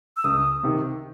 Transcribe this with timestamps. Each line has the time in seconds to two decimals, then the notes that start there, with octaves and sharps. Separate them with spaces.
0.17 E6
0.24 C#2 D#6
0.63 C3 D#3